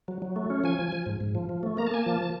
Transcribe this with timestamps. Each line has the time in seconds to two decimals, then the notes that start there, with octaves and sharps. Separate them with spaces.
0.08 F#3
0.22 F#3
0.36 A3
0.50 C#4
0.64 F3 G#5
0.79 F3
0.92 F3
1.06 G#2
1.21 G#2
1.35 F3
1.49 F3
1.63 A3
1.77 A#3 A#5
1.87 A5
1.91 A#3 G#5
2.03 F3 A5
2.21 F3